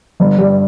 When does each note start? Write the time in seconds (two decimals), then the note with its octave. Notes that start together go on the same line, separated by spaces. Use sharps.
0.20 G1
0.38 G2